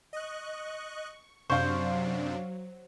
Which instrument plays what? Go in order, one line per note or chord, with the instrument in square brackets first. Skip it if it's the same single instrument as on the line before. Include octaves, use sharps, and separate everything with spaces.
[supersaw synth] D#5 F#6 [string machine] C#6
[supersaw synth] F#2 C3 D4 [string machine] F#3 [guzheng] C5 [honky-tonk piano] F5 C#6